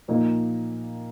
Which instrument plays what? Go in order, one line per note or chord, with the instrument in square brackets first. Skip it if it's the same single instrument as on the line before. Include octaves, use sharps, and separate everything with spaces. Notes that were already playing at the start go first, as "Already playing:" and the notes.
[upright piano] A#2 F3 A#3 D#4 A#4